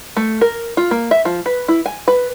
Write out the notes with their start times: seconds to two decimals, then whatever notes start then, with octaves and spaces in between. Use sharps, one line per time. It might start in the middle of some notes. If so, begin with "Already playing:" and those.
0.17 A3
0.41 A#4
0.77 F4
0.91 A#3
1.11 E5
1.25 F3
1.46 B4
1.68 E4
1.86 G#5
2.08 B4